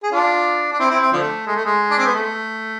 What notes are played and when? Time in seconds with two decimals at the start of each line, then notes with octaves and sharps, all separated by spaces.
0.03 G#4
0.12 D4 F4
0.72 D4
0.79 C4 E4
0.90 C4 E4
1.01 C4
1.12 D3 F3 A3
1.47 G#3
1.56 A3
1.66 G#3
1.91 D4
1.98 C4
2.06 B3
2.13 A3